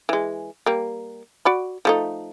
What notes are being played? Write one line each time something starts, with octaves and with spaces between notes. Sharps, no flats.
E3 G#3
G3 A#3
F#4 D5 B5
F3 A3 D#4